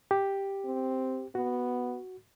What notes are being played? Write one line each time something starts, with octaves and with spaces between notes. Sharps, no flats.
G4
C4
B3 F#4